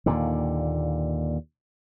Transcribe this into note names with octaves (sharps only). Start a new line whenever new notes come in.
D#2 A#2 D3